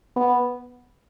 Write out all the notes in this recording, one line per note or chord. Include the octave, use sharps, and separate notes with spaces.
B3